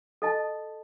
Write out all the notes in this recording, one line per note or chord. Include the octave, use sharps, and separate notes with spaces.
A4 D#5 A5